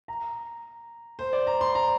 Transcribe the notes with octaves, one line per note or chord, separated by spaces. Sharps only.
A#5
C5
D5
A#5
C6
A#5